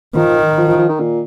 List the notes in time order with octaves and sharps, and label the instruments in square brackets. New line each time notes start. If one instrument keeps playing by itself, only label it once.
[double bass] D#3 [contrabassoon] F3
[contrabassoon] F3
F3
F3
D#3
A#2